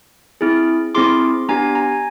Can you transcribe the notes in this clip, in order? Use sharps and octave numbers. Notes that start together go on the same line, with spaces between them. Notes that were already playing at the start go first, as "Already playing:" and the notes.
C4 E4 G#4
C4 E4 G#4 C6 D6
B3 D4 G4 G#5 A#5
G#5 A#5